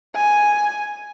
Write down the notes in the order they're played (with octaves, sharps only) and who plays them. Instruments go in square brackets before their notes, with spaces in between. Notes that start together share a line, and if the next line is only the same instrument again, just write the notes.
[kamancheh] G#5